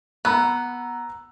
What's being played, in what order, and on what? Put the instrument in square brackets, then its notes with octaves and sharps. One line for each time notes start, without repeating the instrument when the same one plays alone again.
[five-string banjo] B3 [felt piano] A#5 E6 F#6